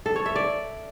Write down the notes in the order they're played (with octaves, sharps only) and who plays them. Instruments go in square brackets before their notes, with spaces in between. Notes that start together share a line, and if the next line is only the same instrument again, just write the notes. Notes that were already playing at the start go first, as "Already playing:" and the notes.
[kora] A4
C#5
E5
D5